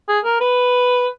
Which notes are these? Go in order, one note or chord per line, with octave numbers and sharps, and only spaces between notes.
G#4
A#4
B4